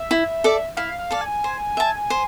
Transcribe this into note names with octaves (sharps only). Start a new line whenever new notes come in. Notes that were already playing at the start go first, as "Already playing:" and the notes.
Already playing: E5
E4
A4 D5
E4 F5
F5
A4 D5
G#5
C5
E5 A5
C5